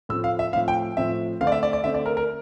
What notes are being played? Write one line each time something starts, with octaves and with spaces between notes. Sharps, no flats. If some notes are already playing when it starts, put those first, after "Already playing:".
A2 F3 A3 C4 E6
F5
E5
A2 F3 C4 F5
G5
A2 F3 C4 E5
D3 A3 C4 F5
D5
E5
D5
D5
D3 A3 C4 E5
D5
A#4
A#4